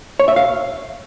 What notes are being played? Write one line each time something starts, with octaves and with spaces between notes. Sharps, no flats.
C#5
E5
F5